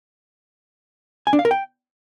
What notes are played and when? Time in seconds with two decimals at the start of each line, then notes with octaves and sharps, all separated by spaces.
1.27 G#5
1.33 D4
1.39 F5
1.45 A#4
1.51 G5